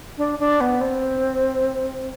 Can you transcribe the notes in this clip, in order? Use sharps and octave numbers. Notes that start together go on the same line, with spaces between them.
D4
D4
B3
C4